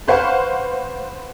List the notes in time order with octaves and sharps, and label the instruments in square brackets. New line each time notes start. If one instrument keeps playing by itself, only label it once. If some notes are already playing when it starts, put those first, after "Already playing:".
[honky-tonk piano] B4 C5 F5 F#5 C#6